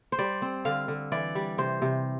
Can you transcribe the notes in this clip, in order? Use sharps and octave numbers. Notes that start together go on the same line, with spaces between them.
C5
G3 D5
C4
D3 F5
D3
E3 D5
G3
C3 C5
C3